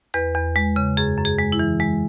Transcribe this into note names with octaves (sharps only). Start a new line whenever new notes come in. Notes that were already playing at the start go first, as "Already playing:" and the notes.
E2 B4
E2
G#3
C#3
F#2 G#4
F#2
G#4
G#3
E4
E3
G#3